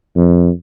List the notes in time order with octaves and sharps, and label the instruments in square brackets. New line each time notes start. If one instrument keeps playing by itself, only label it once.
[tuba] F2